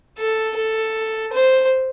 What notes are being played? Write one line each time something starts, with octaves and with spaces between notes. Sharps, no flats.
A4
A4
C5